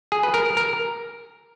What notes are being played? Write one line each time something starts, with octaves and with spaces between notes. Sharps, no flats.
G#4
B4
A#4
A#4